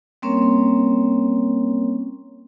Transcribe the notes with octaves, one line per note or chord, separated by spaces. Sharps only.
G3 A#3 C4 C#4 A#4 C#5